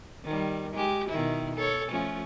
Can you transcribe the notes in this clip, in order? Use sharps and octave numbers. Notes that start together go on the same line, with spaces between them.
D#3 G3
G#3 G4
B2 D#3 E4
A4 C#5
F3 A3 C#4